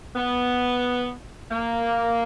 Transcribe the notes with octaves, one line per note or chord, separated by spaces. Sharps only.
B3
A#3